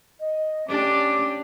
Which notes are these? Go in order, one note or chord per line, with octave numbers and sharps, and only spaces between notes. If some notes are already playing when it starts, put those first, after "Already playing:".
D#5
C#4 D4 G4 D6